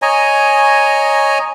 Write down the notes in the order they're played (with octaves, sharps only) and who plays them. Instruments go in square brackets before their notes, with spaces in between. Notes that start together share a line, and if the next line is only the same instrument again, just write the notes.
[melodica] C#5 D#5 G#5 A#5